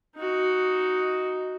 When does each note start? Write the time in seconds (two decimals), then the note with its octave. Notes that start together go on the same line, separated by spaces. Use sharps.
0.16 D#4 F#4